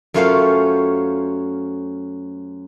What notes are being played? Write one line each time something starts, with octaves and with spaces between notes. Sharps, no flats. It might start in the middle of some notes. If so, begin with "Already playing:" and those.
F#2 A3 C#4 F4 C5 F5